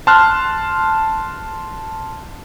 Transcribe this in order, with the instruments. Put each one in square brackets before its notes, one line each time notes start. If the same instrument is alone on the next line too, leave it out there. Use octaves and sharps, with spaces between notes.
[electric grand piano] A5 C6 F6 F#6